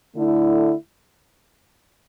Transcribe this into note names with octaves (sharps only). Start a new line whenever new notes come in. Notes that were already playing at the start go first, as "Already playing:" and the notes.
D3 A3 E4